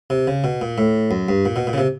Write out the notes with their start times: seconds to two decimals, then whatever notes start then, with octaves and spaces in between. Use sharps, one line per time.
0.10 C3
0.27 C#3
0.44 B2
0.61 A#2
0.78 A2
1.11 F#2
1.29 G2
1.45 A#2
1.56 B2
1.67 A#2
1.73 C#3
1.78 C3